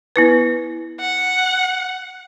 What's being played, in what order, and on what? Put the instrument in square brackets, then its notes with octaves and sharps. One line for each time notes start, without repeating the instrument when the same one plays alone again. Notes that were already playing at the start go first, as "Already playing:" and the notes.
[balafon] B3 E4 B4
[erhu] F#5